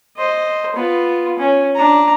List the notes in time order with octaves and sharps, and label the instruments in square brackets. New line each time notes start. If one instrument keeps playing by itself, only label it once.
[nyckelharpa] C5 D#5
B3 F4
C#4
D4 A#5